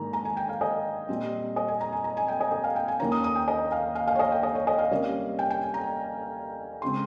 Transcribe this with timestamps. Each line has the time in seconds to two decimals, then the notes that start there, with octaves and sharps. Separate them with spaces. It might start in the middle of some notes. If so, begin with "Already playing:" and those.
Already playing: G#2 D#3 A#3 A#5
0.13 A#5
0.25 G#5
0.37 G5
0.49 F5
0.61 D#5
1.09 A#2 G3 C4
1.56 D#5
1.68 G#5
1.81 A#5
1.92 G#5
2.04 A#5
2.17 G#5
2.28 G5
2.40 D#5
2.52 D#5
2.64 F5
2.76 G5
2.88 G#5
3.00 D#2 D#3 A#3 C#4 A#5
3.12 D#6
3.24 D#6
3.36 G5
3.48 D#5
3.72 F5
3.95 F5
4.07 F5
4.15 C#5
4.19 D#5
4.32 G5
4.43 D#5
4.55 C#5
4.67 D#5
4.79 F5
4.91 C3 G3 A#3 C#4
5.39 G5
5.50 G5
5.63 G#5
5.74 A#5
6.82 C#3 G#3 C4 C6